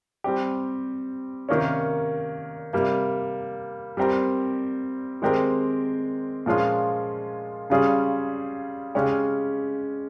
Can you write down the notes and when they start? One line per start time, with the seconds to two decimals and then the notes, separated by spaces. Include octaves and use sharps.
0.24 G3 C4 G4
1.49 C3 D#3 A#3 C#4
2.73 C3 G3 A#3
3.97 G3 C4 G4 A#4
5.22 D#3 G#3 C4 G4 A#4
6.46 A#2 F3 G#3 C#4 F4
7.70 C#3 G3 C#4 F4 G#4
8.95 C#3 G#3 C#4 G4